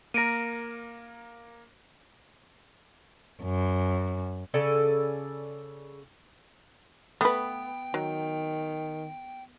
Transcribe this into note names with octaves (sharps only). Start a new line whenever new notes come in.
A#3 A#4 A#6 D7 D#7
F#2
C#3 A4 D5 G#5
A3 B3 B4 G5
D#3 F#3